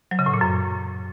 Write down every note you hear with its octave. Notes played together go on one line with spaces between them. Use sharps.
F#3
C#3
A2
A#2
F#2